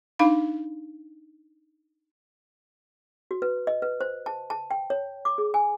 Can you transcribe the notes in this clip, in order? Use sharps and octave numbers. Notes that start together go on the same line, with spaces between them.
D4 D#4 F5 B5
F#4
B4
D#5
B4
C5
A5
A5
G5
C#5
D6
G#4
G#5